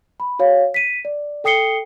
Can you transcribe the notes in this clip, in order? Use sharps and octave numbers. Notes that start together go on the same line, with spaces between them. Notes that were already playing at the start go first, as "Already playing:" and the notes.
B5
F#4 C#5 F5
B6 D#7
D5
A4 G5 D#6 C7 C#7 G7